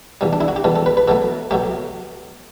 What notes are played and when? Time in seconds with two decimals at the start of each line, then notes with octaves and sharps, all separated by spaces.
0.21 E2 B2 G3
0.33 D4
0.41 E4
0.48 F#4
0.56 G4
0.64 E2 B2 G3 A4
0.76 A4
0.86 B4
0.97 B4
1.08 B2 F#3 A3 A4
1.51 B2 F#3 A3 G4